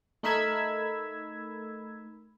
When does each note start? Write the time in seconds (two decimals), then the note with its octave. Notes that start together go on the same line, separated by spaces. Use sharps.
0.23 A3 D#4 A#4 B5 E6 G#6